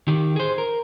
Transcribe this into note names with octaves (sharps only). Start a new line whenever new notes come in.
D#3 G4
G#4 C5
A#4